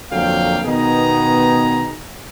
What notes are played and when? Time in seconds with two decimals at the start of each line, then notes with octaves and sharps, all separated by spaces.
0.12 F2 D3 F#3 A#3 F5 G5
0.65 B2 D#3 B3 D#4 G#4 A#5